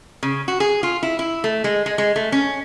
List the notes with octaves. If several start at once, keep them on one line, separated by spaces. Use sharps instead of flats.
C#3
F#4
G#4
F4
E4
E4
A3
G#3
G#3
G#3
A3
C#4